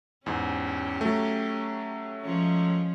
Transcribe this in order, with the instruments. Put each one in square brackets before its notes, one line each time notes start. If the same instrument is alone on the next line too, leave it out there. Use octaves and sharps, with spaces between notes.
[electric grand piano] E2 G#2 [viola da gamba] C#4 G4
[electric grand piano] F#3 A3
[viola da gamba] F3 G#3 C#4